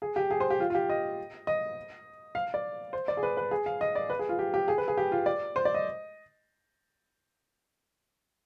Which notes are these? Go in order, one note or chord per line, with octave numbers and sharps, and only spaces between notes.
G#4
G4
G#4
C5
G4
F4
F4
G4
D#5
D#5
F5
D5
C5
D5
G#4
B4
B4
G#4
F5
D#5
D5
B4
G#4
F4
G4
G4
G#4
B4
G#4
G4
F4
D5
C5
D5
D#5